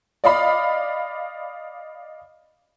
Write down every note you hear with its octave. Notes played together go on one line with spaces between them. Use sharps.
D5 D#5 F5 B5